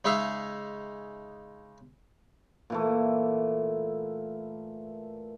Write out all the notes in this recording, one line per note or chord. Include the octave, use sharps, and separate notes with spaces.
C#3 G#3 D#4 E5 F5
A#2 E3 A3